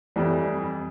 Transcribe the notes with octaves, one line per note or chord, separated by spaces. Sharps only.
F2 E3 G3